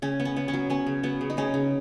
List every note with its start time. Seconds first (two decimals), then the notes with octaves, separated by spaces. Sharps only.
0.02 C#3 C#4
0.20 B3
0.25 C#4
0.36 B3
0.48 C#4
0.54 F#3
0.70 B3 C#4
0.87 C#3
1.03 F#3 B3
1.21 C#3
1.30 D#4
1.37 C#3 C#4
1.54 C#3